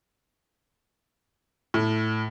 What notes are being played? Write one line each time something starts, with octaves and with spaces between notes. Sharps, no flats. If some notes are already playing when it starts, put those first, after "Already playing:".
A2